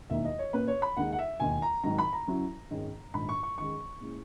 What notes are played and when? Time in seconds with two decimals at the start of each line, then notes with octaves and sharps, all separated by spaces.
0.10 E1 D#2 D#3 A#3 D#4 E5
0.25 D#5
0.39 C#5
0.53 A#2 A#3 C#4 B4
0.68 C#5
0.82 B5
0.97 D#2 D#3 G#3 D#4 F#5
1.12 F#5
1.19 E5
1.40 E1 D#2 D#3 G#5
1.62 A#5
1.84 G#1 G#2 D#3 F#3 A#5
1.98 B5
2.13 A#5
2.27 F#2 C#3 F#3 C#4 E4
2.71 G#1 F#2 D#3 G#3 C#4
3.14 A#1 G#2 D#3 B5
3.29 C#6
3.43 C#6
3.57 F#2 D#3 G#3 C#6
4.01 A#2 G#3 C#4 E4